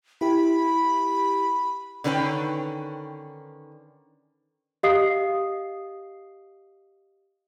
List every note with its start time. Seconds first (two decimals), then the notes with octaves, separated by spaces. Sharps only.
0.21 E4 G4 B5
2.04 D3 D#3 C#4 B4 G5
4.83 G4 D#5 F5 D#6 C7